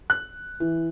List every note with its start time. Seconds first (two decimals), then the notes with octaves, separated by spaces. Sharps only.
0.10 F#6
0.60 E3